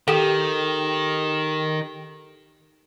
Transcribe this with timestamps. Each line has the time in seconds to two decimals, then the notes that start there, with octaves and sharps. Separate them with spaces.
0.08 D#3 G4 A4 E7